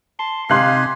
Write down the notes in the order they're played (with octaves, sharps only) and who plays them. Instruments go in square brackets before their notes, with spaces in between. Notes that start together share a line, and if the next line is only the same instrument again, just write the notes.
[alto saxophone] A5 [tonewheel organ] C6
[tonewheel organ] C3 [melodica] D#4 G4 G#5 [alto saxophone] F5 [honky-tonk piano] C6 F#6 C7